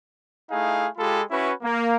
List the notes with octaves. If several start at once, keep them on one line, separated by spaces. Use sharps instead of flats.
A3 D#4 E4 G#4 F5
G#3 F4 G4 A4 B5
C#4 E4 F#4 B4
A#3